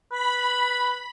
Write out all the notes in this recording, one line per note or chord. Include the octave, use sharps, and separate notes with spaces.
B4 B5